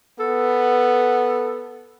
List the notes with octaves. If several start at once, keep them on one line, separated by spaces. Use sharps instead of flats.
B3 A4